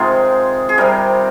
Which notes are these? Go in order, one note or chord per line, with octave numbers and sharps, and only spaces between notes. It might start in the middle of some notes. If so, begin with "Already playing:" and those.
Already playing: C3 D#3 G#3 D#4 F4 G#4
G#4
C3 G3 G4 A#4